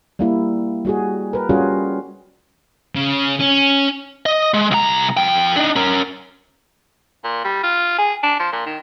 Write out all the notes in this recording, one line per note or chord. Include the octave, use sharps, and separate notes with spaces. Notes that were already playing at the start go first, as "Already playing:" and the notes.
G3 A#3 E4
G3 F#4 G#4
A#4 B4
G3 C#4 F4 F#4 G#4
C#3
C#4
D#5
G#3
C2 A#5
F2 G5
D4 D#4
C#4 A#4
A#2
G3
F4
G#4
D4
F3
A#2
D#3